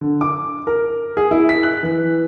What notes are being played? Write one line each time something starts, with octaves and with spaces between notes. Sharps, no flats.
D3
D6
A#4
G#4
E4
B6
F#6
E3